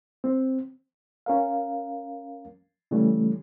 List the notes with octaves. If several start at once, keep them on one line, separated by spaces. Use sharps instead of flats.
C4
C#4 A#4 F5
C#3 E3 G3 A3 C#4